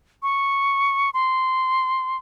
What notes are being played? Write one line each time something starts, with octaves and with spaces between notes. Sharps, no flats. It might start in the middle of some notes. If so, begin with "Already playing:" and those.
C#6
C6